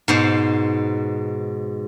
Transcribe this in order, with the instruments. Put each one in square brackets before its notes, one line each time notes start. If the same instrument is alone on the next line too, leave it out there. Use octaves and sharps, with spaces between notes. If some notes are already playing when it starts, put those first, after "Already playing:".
[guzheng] G#2 B2 C5